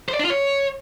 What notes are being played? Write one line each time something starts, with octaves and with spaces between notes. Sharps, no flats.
C5
D5
D4
F4
C#5